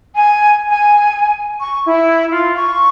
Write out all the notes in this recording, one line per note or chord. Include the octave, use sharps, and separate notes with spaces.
G#5
G#5
C#6
E4
F4
C#6